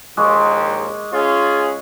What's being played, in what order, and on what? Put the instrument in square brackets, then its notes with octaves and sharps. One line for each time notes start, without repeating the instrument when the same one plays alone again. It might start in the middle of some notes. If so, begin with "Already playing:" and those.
[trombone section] A#1 D#2 [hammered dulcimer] G#3 [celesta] D#5 C#6 D6
[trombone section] C#4 F4 G#4